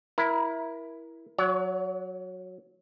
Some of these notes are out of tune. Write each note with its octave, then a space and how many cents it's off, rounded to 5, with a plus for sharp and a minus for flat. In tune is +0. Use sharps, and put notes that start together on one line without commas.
E4 +0 A#4 +25
F#3 -10 C#5 +40